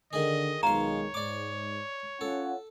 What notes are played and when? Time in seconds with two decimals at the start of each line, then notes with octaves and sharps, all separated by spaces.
0.13 D3 D#3 G#4 D#5
0.63 B1 D#3 G#3 F4 C#5 F5 A#5
1.14 G#2 D5 D6
2.21 C#4 F4 A4 F#5